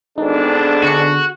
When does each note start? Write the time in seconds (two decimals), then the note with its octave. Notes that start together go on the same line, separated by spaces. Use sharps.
0.18 G#1 B3 D4 D#4 G#4 A4
0.83 D3 F#4 C#7